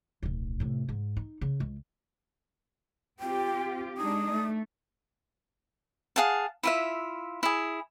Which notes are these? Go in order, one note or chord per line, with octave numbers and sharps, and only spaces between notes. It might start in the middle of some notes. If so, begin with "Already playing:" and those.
D1 B1
A2 C3
G#2
D#4
C#3
C#2
C4 F4 G4 G5
G#3 D4 D#4 D#6
A3
G#4 F5 F#5 A5
E4 F4 E5
E4 G#4